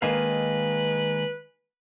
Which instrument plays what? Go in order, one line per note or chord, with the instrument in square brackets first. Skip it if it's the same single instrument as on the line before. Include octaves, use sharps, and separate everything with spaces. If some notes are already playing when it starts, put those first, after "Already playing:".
[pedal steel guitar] D#3 G#3 F5 [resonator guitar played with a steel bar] A#3 D#5 [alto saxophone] B4